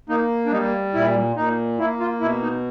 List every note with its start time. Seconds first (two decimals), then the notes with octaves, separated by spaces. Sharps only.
0.09 A#3 D#4
0.46 D4
0.52 G3 D#4
0.94 A#2 E4
1.36 A#2 D#4
1.79 A#3 E4
2.00 F4
2.21 B2 E4
2.42 D#4